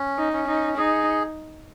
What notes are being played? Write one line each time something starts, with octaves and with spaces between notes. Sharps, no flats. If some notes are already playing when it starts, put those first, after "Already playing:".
Already playing: C#4
D#4
C#4
D#4
D#4 G#4